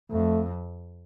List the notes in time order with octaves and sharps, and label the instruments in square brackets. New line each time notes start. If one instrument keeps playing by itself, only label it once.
[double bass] F2 [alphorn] A3